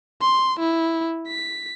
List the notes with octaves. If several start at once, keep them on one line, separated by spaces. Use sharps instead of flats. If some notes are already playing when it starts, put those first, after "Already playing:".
C6
E4
B6